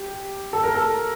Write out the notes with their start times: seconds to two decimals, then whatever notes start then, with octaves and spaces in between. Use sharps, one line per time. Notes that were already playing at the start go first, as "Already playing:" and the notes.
Already playing: G4
0.53 A4
0.63 A#4
0.75 A4